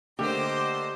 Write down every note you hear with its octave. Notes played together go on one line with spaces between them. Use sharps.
D3 A3 A#3 G4 C5 D#5